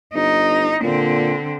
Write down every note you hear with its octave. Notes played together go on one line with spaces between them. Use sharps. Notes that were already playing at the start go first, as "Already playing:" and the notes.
G1 D#4
A#2 D3 C4